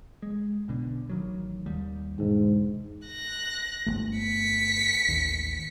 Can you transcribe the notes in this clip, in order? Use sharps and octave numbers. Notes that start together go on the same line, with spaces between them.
G#3
B1 B2 D3
A1 D#3 F#3
D#2 D#3 G3
E1 G#2 D3
F#6 A#6
G1 F2 A3
B6 C#7
A1 D#2